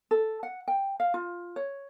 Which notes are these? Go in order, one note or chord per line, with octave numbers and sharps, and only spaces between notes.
A4
F#5
G5
F5
F4
C#5